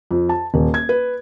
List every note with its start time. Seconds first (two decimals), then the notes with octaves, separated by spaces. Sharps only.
0.11 F2
0.29 A5
0.54 D#1
0.74 G#6
0.89 B4